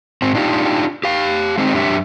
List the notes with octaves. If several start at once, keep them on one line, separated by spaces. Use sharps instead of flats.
G#2 C4
D4 D#4 F4 G4
G4 F5
G#3 C4 D#4
F#2 D4 G4 E5